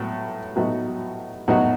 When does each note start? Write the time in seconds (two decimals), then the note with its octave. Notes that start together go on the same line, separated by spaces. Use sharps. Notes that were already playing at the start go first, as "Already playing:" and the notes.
Already playing: A2 F#3 B3
0.56 A2 F#3 B3 D#4 F#4
1.48 A2 F#3 B3 D#4 F#4